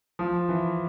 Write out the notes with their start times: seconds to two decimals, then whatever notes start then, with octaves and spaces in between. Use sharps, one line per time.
0.19 F3
0.49 E3